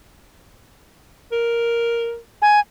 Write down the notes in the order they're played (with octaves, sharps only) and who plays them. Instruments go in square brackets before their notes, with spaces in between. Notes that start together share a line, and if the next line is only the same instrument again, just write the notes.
[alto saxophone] A#4
[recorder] G#5